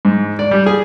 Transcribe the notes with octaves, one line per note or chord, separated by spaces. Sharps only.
G#2
D5
G3
G#4